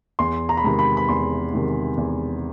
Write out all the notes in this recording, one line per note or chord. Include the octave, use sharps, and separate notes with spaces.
E2 C6
A#5
B5
C3 D#3 G#3 A#5
B5
B5
E2 C6
C3 D#3 G#3
E2